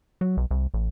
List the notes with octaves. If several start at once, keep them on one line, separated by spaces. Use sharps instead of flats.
F#3
B1
C2
A1